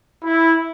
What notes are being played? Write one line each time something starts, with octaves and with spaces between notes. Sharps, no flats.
E4